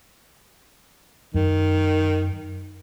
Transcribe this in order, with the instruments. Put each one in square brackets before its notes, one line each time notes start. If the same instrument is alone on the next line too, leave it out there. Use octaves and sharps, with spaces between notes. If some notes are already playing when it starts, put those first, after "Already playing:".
[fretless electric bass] F#2 [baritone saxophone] D#3